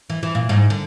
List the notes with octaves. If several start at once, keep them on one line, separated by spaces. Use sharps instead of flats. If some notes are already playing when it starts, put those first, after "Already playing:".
E3
E3
A#2
G#2
D3